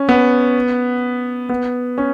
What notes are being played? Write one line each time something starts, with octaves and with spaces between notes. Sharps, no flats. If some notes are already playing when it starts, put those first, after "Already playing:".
Already playing: C#4
B3
B3
C#4